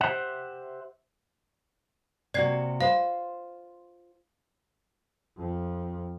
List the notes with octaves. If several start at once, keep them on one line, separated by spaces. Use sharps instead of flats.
G4 C5 E5 F#5
C3 A#3 F#4 D5 G#6 C7
F4 C5 F5
F2